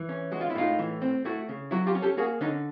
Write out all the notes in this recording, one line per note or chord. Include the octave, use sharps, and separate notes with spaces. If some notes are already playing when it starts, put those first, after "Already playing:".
Already playing: E3
C#4
G#3 F#4
F4
E4
A2 D#4 F4
E3
C4
A3 E4 F#4
C#3
F#3 E4 F#4
F4 G4
C#4
G4 A4
A#3 F#4 G#4
D3 C#4 D#4